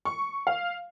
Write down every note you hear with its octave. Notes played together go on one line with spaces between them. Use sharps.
C#6
F5